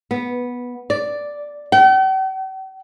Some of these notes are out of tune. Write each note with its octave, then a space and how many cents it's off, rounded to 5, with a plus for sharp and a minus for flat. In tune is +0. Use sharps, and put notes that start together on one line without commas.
B3 -10
D5 +0
G5 -45